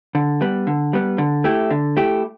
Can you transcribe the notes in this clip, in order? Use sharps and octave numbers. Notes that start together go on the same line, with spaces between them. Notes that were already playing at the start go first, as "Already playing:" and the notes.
D3
G3 B3
D3
G3 B3
D3
A3 E4 G4
D3
A3 E4 G4